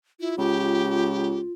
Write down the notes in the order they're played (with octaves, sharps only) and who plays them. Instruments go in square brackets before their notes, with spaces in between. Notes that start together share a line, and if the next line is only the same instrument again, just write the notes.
[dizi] E4 [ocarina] F4
[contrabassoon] C#2 [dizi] G4